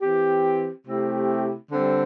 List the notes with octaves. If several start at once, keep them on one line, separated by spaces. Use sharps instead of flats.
E3 C4 G4
C3 A3 C4 E4 G4
D3 G3 C4 A4 C5